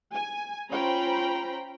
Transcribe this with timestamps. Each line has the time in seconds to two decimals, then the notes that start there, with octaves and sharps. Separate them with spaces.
0.14 G#5
0.71 C#4 F4 C5 G5 A#5 B5